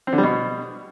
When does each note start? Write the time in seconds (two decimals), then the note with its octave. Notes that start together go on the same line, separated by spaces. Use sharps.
0.07 C4
0.13 D3
0.18 G3
0.24 B2